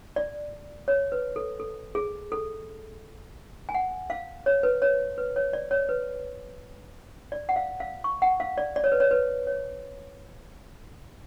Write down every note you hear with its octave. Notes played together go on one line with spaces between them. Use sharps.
D5
C#5
B4
A4
A4
G#4
A4
G#5
F#5
F5
C#5
B4
C#5
B4
C#5
D5
C#5
B4
D5
F#5
F5
F5
C#6
F#5
F5
D5
D5
C#5
B4
C#5
B4
C#5